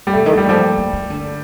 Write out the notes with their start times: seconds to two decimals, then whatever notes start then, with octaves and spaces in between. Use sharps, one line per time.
0.07 G3
0.14 C3 A3
0.26 D#3
0.33 A3
0.37 D#3 G3
0.49 F3 G3
0.78 F3
0.93 D#3
1.10 D3